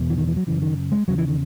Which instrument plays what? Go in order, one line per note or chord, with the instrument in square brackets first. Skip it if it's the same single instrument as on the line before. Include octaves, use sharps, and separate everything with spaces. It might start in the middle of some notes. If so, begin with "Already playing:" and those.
Already playing: [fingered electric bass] E2 B2
E3
D#3
E3
F#3
F#2 C#3 E3
D#3
G#3
E2 C#3 F#3
E3
D#3